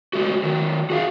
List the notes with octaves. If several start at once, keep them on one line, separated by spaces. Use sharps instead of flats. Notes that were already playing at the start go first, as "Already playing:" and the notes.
G#3 A3 F#4
D#3 F#3
F#4 G#4 F5